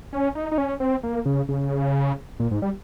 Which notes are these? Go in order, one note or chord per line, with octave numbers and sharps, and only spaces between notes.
C#4
D#4
D#4
C#4
C4
A#3
C#3
C#3
A#2
G#2
G3